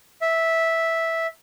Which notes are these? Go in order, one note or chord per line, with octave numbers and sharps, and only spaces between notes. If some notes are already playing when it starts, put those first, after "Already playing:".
E5